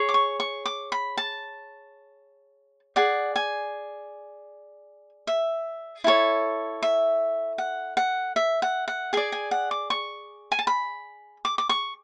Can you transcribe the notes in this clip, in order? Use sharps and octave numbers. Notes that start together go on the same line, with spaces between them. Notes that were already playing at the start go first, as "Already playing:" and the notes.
Already playing: G#4 C#5
D6
C#6
C#6
D6
B5
A5
G#4 D5 F#5
G#5
E5
E4 A4 C#5
E5
F#5
F#5
E5
F#5
F#5
G#4 D5 G#5
G#5
F#5
D6
C#6
G#5
A5
B5
D6
D6
C#6